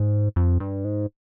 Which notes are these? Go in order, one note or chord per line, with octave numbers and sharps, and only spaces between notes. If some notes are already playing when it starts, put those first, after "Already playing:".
Already playing: G#2
F2
G2
G#2